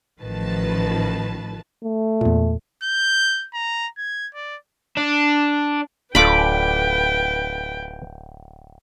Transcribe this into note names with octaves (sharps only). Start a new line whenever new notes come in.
A1 D#3 F3 B4 A5
A3
E2 A#2
G6
A#5
G#6
D5
D4
D1 D4 F4 A4 B4 G5 B5 D6